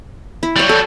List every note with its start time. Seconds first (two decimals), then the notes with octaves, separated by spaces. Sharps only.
0.43 E4
0.56 F#3 G3 C#5 F5
0.69 A4